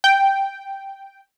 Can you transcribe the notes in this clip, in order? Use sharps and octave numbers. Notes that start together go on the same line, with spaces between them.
G5